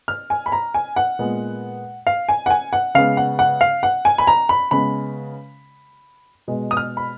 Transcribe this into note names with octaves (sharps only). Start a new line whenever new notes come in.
F6
G#5
B5
A#5
G#5
F#5
A#2 G#3 B3
F5
G#5
F#5
G#5
F#5
C#3 G#3 B3 F5
F#5
F#5
F5
F#5
G#5
B5
A#5
B5
C#3 G#3 B3 B5
B2 G#3 B3
D#6
F6
B5